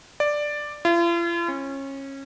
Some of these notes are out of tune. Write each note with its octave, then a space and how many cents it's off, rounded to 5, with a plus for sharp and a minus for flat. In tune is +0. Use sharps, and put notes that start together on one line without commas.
D5 +5
F4 -45
C#4 -25